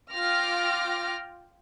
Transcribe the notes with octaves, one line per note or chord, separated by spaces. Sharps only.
F4 G5 D6 F6 A#6